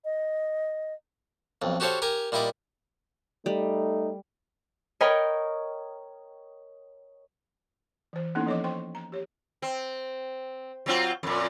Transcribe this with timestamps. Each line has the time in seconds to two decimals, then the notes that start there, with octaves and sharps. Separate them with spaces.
0.05 D#5
1.62 B1 F2
1.80 F#4 G4 A4 C5 C#5 F5
2.02 G4 A#4 G#5 A#5
2.32 A#2 G3 E4 D#5 D6
3.46 G3 A3 D#4
5.01 A#4 C#5 D#5 G5 B5
8.13 E3 C5
8.35 A#3 B3 C#4 D#4 E4 A4
8.46 F3 A4 C#5 D#5 D6
8.64 C5 G5 C6 C#6
8.95 A#5
9.12 G4 C#5
9.62 C4
10.86 F#3 C4 F4
11.23 F2 A#2